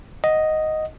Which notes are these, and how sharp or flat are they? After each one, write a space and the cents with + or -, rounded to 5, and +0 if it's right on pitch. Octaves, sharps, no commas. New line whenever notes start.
D#5 +0 F#5 +0